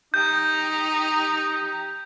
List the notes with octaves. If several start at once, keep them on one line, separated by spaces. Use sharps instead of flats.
D#4 G4 A#5 G6